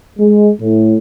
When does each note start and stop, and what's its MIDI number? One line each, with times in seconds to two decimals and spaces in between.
0.19 0.49 56
0.61 0.96 45